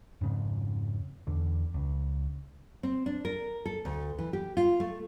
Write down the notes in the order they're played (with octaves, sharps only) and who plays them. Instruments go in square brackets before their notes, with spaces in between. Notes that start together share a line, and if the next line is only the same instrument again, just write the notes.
[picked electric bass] F2 G#2 C#3
E2 D3
C#2
[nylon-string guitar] C4
D4
A#4
A4
D2
E3
G4
F4
A3